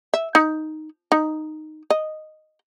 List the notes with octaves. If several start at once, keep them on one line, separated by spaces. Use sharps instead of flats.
E5
D#4
D#4
D#5